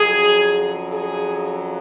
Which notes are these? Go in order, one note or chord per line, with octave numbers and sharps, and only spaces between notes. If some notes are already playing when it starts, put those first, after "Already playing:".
Already playing: F2 C#3 F#3 G#4
G#4